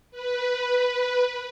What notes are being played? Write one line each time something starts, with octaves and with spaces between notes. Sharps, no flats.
B4